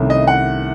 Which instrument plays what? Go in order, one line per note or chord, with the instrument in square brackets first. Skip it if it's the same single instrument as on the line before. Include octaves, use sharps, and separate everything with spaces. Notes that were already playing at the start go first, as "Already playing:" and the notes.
Already playing: [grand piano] C2 C3 D#3 A3 C#4
D#5
F#5